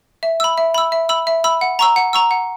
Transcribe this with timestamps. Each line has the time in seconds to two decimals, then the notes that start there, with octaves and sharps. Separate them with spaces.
0.23 E5
0.40 B5 E6
0.58 E5
0.74 B5 E6
0.92 E5
1.09 B5 E6
1.27 E5
1.44 B5 E6
1.61 F#5
1.79 A#5 C#6 E6
1.96 F#5
2.13 A#5 C#6 E6
2.31 F#5